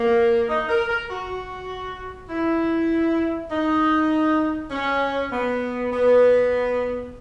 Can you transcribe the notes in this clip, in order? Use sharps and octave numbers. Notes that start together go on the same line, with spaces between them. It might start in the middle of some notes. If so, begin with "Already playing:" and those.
Already playing: A#3
D#4
A#4
A#4
F#4
E4
D#4
C#4
B3
B3